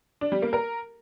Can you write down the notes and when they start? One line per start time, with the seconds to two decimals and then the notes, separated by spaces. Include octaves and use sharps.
0.21 D4
0.32 G3
0.42 A#3
0.53 A#4